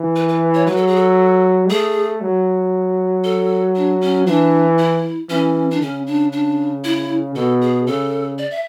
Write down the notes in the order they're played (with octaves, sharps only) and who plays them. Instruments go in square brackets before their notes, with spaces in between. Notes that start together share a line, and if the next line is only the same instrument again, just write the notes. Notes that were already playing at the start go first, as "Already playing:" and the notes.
Already playing: [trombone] E3
[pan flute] B4
B4
C#5
[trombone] F#3 [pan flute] B4
[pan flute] A4
G#4
A4
[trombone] A3 [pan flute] G#4
[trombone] F#3
[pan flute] A4
D4
C#4
[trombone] E3 [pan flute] D4
[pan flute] E4
[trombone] E3 [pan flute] C#4
[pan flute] D4
[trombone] C#3 [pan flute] C#4
[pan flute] D4
D4
E4
[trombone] B2 [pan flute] A4
[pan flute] G#4
[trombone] C#3 [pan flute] A4
[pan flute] D5
E5